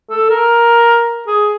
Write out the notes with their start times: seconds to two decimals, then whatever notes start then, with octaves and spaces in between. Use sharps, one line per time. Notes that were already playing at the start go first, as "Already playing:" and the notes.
0.10 A4
0.30 A#4
1.27 G#4